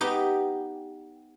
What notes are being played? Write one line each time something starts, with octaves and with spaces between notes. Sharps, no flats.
B3 D#4 G4